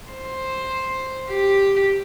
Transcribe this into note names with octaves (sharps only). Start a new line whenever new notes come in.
C5
G4